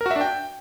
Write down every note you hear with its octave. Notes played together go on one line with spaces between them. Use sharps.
A#4
F#4
E5
D4
G5